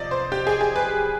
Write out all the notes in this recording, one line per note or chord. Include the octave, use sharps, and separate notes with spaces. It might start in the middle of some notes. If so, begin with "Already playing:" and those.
Already playing: C3 F3 D5 D#5
C5
G4
G#4
G#4
B4